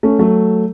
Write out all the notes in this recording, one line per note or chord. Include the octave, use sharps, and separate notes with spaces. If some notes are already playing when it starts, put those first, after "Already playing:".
A3 C#4
F#3 A3